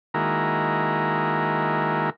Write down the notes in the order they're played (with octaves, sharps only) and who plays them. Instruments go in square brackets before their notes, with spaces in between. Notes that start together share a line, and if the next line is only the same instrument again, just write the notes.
[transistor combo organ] D#3 G#3 A#3 E4 F#4 A#4